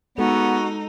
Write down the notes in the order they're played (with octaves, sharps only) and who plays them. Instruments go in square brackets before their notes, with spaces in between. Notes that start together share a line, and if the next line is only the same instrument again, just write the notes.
[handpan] G#3 A4 [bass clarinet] B3 [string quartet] D#4 [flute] F#4